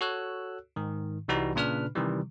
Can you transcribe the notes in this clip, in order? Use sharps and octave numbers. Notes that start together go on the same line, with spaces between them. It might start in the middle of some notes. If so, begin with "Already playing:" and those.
F#4 A4 C#5 E6 F#6
G#2 D#3
C2 E3 G3 D#4 F#4 A#5
A#2 C#3 D4 B4 B5 F6
C3 D#3 E3 G3